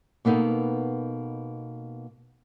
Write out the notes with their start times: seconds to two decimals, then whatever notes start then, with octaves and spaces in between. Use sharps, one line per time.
0.25 B2 A#3 B3 D#4 A4